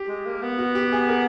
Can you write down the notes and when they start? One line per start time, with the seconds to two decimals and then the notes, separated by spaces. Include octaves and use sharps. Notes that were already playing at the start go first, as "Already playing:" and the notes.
Already playing: G4
0.08 G#3
0.26 A#3
0.42 B3
0.59 F#4
0.75 G4
0.92 G#4
1.09 A#4